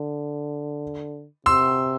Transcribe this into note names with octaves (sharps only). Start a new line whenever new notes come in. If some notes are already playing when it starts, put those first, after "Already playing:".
Already playing: D3
C3 C6 E6